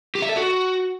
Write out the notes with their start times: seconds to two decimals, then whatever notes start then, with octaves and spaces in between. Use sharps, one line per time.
0.15 G4
0.22 E5
0.29 A4
0.36 F#4